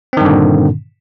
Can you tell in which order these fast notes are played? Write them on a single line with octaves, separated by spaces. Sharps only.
C4 D#3 G2 D3 A#2